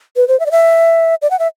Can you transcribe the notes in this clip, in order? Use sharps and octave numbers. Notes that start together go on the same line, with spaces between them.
B4
C5
E5
D5
E5
D5
F#5
E5